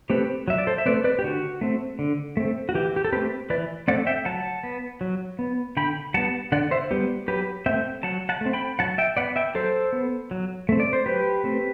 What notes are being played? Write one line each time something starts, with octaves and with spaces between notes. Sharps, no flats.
A3 C4 G4 B4
F#3 E5
D5
A4 C5
E5
A3 C4 B4 D5
B4 D5
G4
D3 F#4
A3 C4
D3
A3 C4
F#4
E3 G4
G4
A4
A3 C4 G4 B4
E3 B4 D5
A3 C4 D5 F#5
E5 G5
F#3 F#5 A5
B3
F#3
B3
D3 G5 B5
G3 B3 F#5 A5
D3 D5 F#5
C5 E5
G3 B3 G4
F#3 G4 B4
A3 C4 E5 G5
F#3 F#5 A5
F#5 A5
A3 C4
G5 B5
F#3 F#5 A5
E5 G5
B3 D5 F#5
E5 G5
F#3 A4 C5
B3
F#3
A3 C4
D5
C5
F#3 G4 B4
A3 C4